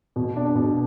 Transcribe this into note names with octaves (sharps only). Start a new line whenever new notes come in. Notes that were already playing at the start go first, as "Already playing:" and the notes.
B2
D4
B2